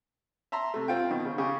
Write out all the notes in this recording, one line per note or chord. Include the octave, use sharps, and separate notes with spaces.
E5 A5 A#5 C6
C3 A3
C4 F4 G5
B2 D#3
C#3
C#3 G4